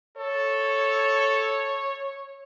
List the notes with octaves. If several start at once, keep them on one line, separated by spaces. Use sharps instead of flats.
A4 C#5